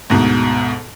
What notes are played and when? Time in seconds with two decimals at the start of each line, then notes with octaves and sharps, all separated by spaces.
0.10 D2 G#2 B2